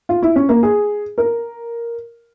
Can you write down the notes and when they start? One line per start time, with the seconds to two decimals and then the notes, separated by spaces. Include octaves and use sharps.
0.09 F4
0.22 E4
0.36 C#4
0.49 A#3
0.63 G#4
1.18 A#4